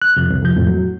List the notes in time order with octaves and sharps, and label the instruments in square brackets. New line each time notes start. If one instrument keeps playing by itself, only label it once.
[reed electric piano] F#6
F2 C3
C2
F2 C3 F3 G6
F2 A2
F#3